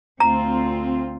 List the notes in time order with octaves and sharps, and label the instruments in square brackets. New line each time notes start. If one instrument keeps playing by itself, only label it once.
[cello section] D2 C4 F4 [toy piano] A#5